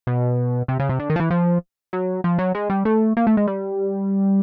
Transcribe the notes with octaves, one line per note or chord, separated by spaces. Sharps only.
B2
C3
C#3
C3
D3
D#3
F3
E3
F3
F#3
F3
F#3
G#3
G3
A3
A#3
A3
G#3
G3